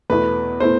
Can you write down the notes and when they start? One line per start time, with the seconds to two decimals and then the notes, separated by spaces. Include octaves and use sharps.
0.10 E2 B2 A3 E4 B4
0.60 B2 A3 E4 C5